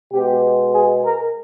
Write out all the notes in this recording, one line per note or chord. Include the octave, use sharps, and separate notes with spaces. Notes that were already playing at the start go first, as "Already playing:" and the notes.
B2 G#3 B3 G4
G#4
A#4